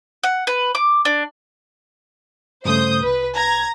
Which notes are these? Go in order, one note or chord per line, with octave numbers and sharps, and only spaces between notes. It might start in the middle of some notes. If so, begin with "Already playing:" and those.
F#5
B4
D6
D4
G2 C#3 A3 C5 D#6 G6
C2 B4
A#5 G#6